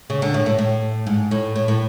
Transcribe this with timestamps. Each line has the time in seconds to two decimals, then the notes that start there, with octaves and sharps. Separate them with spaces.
0.10 C#3
0.22 D3
0.34 A2
0.46 A2
0.59 A2
1.07 G#2
1.31 A2
1.56 A2
1.68 A2